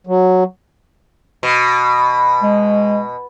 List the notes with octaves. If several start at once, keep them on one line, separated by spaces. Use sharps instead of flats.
F#3
B2
G#3